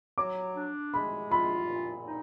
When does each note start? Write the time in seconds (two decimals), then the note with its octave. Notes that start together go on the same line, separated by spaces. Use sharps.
0.18 F#3 D6
0.56 D4
0.94 G#3 B5
1.31 F4 B5
1.69 A#2
2.07 D#4